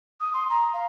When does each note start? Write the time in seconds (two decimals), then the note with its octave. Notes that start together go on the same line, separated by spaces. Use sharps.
0.21 D#6
0.34 C6
0.50 A#5
0.74 F5